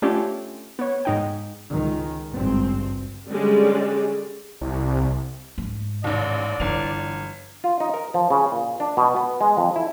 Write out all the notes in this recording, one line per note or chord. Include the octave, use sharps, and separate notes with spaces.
A3 C#4 D4 F4 G4
B3 C#5
G#2 D#4 G5
C#2 D#3
G#1 C#2 G2 C4
D3 G3 G#3 C#4 D5
C2
G#2
A1 D#2 D5
G1 E3 F7
F4
D#4
A#4
F3
C#3
A#2
D4
B2
B3
G#3
F2
E4